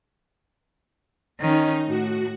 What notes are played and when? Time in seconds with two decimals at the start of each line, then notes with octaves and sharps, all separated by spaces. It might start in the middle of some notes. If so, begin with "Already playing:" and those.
1.40 D#3 C#4 D#4
1.87 A2 F#4